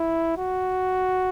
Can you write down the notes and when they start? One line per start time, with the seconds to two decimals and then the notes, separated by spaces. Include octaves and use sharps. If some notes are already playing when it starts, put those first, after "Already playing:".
Already playing: E4
0.38 F#4